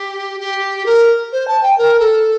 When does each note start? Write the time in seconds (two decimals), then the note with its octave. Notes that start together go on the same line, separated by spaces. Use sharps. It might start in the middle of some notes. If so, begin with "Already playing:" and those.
Already playing: G4
0.40 G4
0.86 A#4
1.32 C5
1.47 A5
1.63 G5
1.78 A#4
1.99 A4